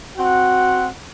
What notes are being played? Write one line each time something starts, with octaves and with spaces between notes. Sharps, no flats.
C4 F#4 F#5